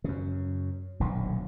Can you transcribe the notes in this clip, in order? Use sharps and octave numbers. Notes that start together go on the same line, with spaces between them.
F#2 C#3
D#1 B1 A#2 D3